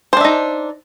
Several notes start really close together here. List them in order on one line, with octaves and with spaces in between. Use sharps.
C5 D4 E5 D#4